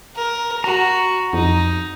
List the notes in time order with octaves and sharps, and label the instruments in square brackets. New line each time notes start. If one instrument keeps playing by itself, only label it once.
[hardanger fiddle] A#4
[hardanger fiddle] F#4 [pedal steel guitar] A#5
[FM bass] F2 [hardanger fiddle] D#4